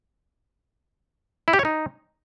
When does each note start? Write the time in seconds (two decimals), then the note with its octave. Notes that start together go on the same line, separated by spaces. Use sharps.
1.48 E4
1.53 G4
1.59 C#5
1.65 D#4